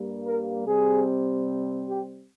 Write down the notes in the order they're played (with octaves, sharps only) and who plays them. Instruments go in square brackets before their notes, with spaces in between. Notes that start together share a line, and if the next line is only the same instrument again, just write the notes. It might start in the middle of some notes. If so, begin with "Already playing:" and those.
Already playing: [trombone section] G2 G3 A#3
A#4
C3 G3 C4 G#4
G4